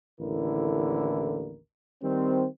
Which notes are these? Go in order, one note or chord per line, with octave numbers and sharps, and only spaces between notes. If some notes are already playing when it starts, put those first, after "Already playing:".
A1 D#2 D3 E4 A#4
D#3 G3 C4